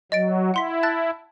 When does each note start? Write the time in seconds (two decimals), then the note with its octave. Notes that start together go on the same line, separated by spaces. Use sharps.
0.12 F#3 D#5 A6 D7
0.54 E4 F#5 C6 B6
0.83 A5 F#6 A6